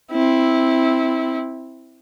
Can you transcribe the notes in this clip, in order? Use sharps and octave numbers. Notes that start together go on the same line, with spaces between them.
C4 E4